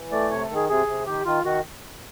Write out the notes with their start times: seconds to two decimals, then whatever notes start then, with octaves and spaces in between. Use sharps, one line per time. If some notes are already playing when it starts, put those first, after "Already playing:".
Already playing: E3
0.12 A3 D5
0.30 C3 C#5
0.43 A4
0.49 D#3
0.55 G#4
0.69 C3 G#4
0.87 C3
1.06 D#3 G4
1.25 D#3 F4
1.44 D#3 F#4